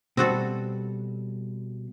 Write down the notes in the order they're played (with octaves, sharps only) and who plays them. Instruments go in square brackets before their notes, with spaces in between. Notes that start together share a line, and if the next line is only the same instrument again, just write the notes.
[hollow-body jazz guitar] B2 G3 [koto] C4 F#4 A4